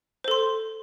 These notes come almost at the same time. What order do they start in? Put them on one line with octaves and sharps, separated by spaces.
C5 A4 C6